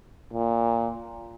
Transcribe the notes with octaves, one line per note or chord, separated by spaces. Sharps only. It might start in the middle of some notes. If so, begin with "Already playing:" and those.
A#2